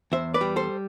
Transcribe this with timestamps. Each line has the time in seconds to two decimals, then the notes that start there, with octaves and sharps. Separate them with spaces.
0.12 E2 C5 E5
0.34 B4 D5
0.41 G3
0.56 A4 C5